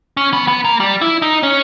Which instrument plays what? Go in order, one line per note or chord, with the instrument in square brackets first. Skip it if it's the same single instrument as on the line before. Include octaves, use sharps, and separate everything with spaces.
[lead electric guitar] C#4
B3
B3
A#3
G3
E4
D#4
C#4